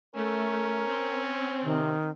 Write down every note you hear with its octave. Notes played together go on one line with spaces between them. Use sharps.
A3 C#4 A#4
C4
C3 D#3